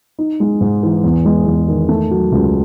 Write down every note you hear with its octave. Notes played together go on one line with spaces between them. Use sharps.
D#4
G#3
G#2
E3
E2
G#3
E2
D#3
A3
F#3
C#2